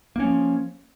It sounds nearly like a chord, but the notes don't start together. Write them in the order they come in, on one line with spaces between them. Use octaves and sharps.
A#3 C#4 F3